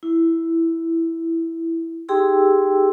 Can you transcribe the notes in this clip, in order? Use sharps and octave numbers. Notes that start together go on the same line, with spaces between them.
E4
D#4 G4 G#4 G5 C6 E6